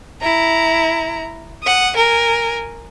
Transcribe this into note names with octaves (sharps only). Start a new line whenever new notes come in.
E4 A#5
F#5 D#6
A#4 G#5